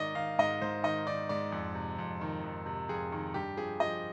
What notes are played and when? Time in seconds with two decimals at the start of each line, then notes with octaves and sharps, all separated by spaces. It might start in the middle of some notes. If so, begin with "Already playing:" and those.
Already playing: G#2 D#3 D5 D#5
0.15 D#3 F5
0.39 G#2 D#5
0.62 G#2 C5
0.84 D#3 D#5
1.07 D#3 D5
1.29 G#2 D5
1.52 F2
1.75 C3
1.98 F2
2.21 D#3
2.44 F2
2.66 C3
2.89 F2 G#4
3.12 D#3
3.34 G2 G4
3.57 F3 G#4
3.80 F3 D#5